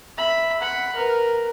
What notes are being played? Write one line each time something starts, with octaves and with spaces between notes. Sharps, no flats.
E5 B5
F#5 B5
A#4 B4